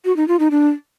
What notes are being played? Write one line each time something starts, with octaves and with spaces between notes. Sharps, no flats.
F#4
D#4
F4
D#4
D4